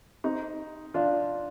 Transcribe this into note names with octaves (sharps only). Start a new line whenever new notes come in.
C4 D#4
D4 F4